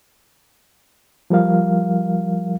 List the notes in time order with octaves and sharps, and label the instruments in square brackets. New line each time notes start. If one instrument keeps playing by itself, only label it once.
[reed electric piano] F3 G3 A#4 F5